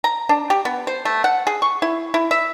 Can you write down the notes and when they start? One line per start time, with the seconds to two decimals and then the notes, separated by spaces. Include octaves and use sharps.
0.04 A#5
0.29 D4
0.50 G4
0.65 B3
0.87 C5
1.05 A3
1.24 F#5
1.47 G#4
1.62 C#6
1.82 E4
2.14 E4
2.31 E5